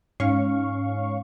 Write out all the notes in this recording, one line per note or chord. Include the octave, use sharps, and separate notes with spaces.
G#2 C#4 F5 C#6